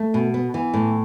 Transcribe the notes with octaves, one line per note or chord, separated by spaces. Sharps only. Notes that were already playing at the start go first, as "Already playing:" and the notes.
Already playing: A3
B2
B3
E3
A2